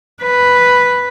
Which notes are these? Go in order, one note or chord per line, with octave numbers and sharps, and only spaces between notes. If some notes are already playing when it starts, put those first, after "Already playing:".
B4